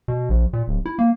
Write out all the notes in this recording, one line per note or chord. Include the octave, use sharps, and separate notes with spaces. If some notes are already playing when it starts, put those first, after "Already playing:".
B2
A#1
A#2
D1
E4
A#3